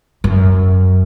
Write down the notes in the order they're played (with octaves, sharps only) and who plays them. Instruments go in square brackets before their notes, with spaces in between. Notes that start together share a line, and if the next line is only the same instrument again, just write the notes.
[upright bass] F#2